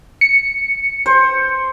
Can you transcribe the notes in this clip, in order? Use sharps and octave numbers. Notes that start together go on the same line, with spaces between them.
C#7
C5